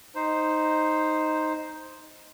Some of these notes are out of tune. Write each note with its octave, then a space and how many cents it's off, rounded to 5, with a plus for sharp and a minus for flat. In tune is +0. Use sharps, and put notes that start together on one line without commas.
D#4 +0 C5 +0